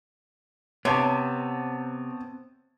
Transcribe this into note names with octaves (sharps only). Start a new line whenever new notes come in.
C3 B3 C4 C#5 A5